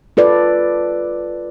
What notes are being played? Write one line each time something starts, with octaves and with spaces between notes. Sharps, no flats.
F4 A4 B4 D5